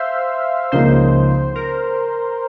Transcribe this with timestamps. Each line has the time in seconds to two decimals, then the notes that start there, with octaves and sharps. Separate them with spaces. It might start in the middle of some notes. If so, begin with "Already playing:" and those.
Already playing: C5 E5 F5
0.72 C#2 C#3 F3 A#3 D#4 C5
1.55 A#4